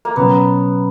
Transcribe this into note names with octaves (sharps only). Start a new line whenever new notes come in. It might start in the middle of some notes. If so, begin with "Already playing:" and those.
A#3
B2 F#3 B3 C#4